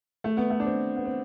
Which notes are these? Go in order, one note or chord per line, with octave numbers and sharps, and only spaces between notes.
A3
B3
A3
D4
C4
B3
C4